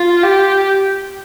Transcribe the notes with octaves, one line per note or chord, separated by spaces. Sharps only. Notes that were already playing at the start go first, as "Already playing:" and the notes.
Already playing: F4
G4